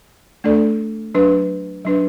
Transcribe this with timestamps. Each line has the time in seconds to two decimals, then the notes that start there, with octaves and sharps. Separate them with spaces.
0.44 A3 D4 A4 D5
1.15 F#3 D4 B4
1.85 F#3 D4 B4